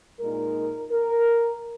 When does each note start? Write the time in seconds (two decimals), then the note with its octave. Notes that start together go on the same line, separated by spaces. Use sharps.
0.20 A#2 G#3 D#4 A#4
0.91 A#4